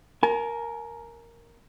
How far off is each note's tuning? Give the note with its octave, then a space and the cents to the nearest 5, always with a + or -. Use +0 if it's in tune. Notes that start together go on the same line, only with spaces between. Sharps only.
A#4 +0 G#5 +40